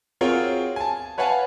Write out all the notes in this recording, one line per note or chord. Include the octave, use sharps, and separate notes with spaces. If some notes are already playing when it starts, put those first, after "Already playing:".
C4 F4 F#4 G#4 A#4 C#5
G#5 A5
B4 C#5 F5 F#5 G#5 A5